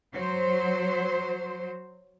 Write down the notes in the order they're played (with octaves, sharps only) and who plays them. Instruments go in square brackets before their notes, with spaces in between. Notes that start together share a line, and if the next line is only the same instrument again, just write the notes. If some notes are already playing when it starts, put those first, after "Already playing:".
[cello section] F#3 C5